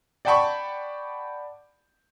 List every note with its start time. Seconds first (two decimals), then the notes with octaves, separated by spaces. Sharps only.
0.25 D5 F#5 G5 A5 B5 C#6